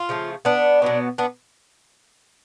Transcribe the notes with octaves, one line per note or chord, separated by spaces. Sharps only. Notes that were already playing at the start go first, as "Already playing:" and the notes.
Already playing: F4
C#3 F3 A3
B3 D4
B2 F#3 B3
B3 D4